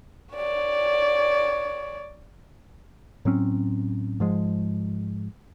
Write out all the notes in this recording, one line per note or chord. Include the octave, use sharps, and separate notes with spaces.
C#5 D5
A2 F#3 C4 C#4
G#2 F3 G#3